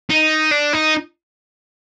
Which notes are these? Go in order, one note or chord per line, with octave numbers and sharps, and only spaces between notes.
D#4
D4
D#4